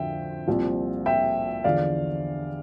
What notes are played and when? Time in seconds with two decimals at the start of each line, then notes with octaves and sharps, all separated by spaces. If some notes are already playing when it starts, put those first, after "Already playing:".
Already playing: F2 D3 F3 E5 G5
0.47 C2 A#2 F3
1.06 E5 G5
1.64 E2 D3 F3 D5 F5